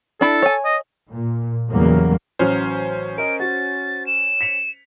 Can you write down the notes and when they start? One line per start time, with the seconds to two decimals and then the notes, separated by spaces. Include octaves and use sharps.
0.21 D4 E4 A4
0.42 C#5 G#5
0.65 D#5
1.12 A#2
1.69 E2 C#3 F#3 G3 A#3
2.39 A1 F#3 C#4 C5 F6
3.18 A#4 D#5 D7
3.40 F#4 A6
4.07 E7
4.41 B6 C#7 F7